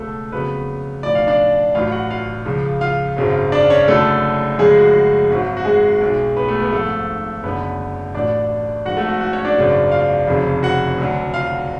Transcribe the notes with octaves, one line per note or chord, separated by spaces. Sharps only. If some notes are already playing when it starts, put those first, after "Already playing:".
Already playing: C#2 B2 F#3 A3 A4
F2 C#3 F#3 B3 B4
B1 A2 F3 D5
F5
D4 D5
A1 A2 F#3 F4 F5
F#4 F#5
F4 F5
C#2 C#3 F3
F4 F5
G#1 F#2 C#3 F#3
D4 D5
C#4 C#5
F#1 F#2 D3 F#3 A3 A4
F#1 F#2 F3 G#3 G#4
F#4
F#4
G#1 G#2 F#3
F#4
G#3 G#4
B1 B2 F#3
B3 B4
A3 A4
B3 B4
G#1 G#2 F3 A3 A4
F#1 F#2 D3 B3 B4
A1 A2 F#3 D4 D5
G#1 G#2 F3 F#4 F#5
A3 A4
F#4
F#4
C#4 C#5
D4 D5
G#1 F#2 C#3 F#3
F4 F5
F1 F2 C#3 F#3
F#4 F#5
D2 D3 F#3
F4 F5